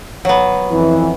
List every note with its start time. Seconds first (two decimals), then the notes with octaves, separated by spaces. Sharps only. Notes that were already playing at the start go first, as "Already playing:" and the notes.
0.25 F#3 B3
0.72 F2 E3